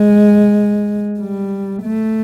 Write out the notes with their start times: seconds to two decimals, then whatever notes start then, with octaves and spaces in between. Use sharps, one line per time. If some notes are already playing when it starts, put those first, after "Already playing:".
Already playing: G#3
1.20 G3
1.83 A3